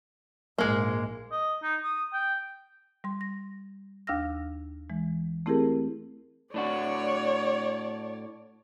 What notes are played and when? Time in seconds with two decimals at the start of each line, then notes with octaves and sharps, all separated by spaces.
0.58 A#1 G#2 G#3 A#3
1.32 D#5
1.63 D#4
1.84 D#6
2.13 G5
3.04 G3 C6
3.21 A#6
4.07 D#2 D4 F5 E6 F6 A#6
4.90 E3 G#3
5.46 A3 C4 E4 G4 G#4 A#4
6.54 A2 D4 F#4 C#5 D5